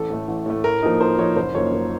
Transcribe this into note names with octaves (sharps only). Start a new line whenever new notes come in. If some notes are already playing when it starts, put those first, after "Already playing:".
Already playing: A1 A4
A2 A3
A1
A2 A3
A2 A#4
F3 A#3 D#4
A2 C5
F3 A#3 D#4 C#5
F#1 C5
F#2 F3 A#3 D#4 C#5
F#1